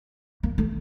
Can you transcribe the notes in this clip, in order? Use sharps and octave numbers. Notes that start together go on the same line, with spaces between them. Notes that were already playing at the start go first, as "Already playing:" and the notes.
A#3
A3